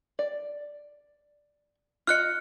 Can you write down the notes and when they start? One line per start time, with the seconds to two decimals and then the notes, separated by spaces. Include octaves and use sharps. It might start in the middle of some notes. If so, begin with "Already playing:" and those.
0.19 D5
2.07 F4 D#5 F6 F#6 C#7